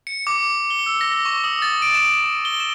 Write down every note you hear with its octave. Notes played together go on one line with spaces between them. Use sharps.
C#7
D6
G7
E6
A#6
C#6
D#6
A6
D7
E7
G7
E7